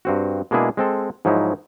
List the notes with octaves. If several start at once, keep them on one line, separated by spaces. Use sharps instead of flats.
G2 C4 F#4
B2 G#3 A#3 D4 E4 G#4
G#3 C4 A4
G#2 F3 F#3 D#4 E4